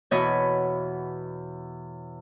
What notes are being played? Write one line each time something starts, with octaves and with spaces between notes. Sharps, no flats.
E2 B2 C#5 D#5 B5